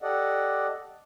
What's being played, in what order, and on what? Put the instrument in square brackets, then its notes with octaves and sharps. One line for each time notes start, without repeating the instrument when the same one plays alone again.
[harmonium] G4 A4 D5 D#5 F#5